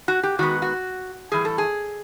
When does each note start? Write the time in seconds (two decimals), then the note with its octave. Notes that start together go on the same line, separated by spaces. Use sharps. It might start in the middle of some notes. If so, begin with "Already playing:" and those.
0.08 F#4
0.23 G4
0.39 D#3 G#3 B3 F#4
0.62 F#4
1.32 A2 E3 G3 G#4
1.45 A4
1.58 G#4